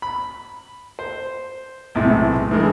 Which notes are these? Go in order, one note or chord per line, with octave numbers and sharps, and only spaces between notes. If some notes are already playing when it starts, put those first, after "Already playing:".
B5
C5
B1 A2 C3 G#3
E3 G3 G#3 D4 A#4